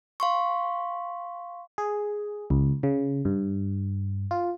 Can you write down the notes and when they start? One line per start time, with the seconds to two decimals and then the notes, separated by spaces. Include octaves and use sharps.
0.20 F5 C6 C#6
1.78 G#4
2.50 C#2
2.83 C#3
3.25 G2
4.31 F4